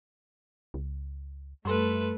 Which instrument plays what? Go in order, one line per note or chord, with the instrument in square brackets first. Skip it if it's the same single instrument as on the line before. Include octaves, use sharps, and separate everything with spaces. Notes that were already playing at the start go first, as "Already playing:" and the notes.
[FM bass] C#2
[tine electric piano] F#2 C6 [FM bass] G3 [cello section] A3 [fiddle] A4 B4